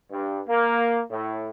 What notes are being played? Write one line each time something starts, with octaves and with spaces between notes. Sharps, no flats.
G2
A#3
A2